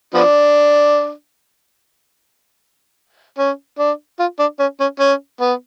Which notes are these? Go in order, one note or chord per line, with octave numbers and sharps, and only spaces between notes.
F3 B3 D4
C#4
D4
F4
D4
C#4
C#4
C#4
B3